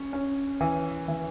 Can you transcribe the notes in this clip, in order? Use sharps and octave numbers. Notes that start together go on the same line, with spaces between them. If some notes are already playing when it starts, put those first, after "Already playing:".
Already playing: C#4
C#4
E3
E3